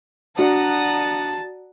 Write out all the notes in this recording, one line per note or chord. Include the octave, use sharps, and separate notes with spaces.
D4 F#4 D5 F#5 A5 A#5 D#6